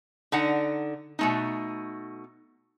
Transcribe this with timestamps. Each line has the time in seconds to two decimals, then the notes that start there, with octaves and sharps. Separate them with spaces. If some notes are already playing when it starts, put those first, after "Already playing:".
0.32 D3 D#4 F#5
1.19 B2 A3 D#4